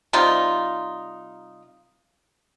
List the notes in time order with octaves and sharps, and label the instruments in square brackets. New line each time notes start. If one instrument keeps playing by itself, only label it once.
[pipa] C3 G3 D#4 F4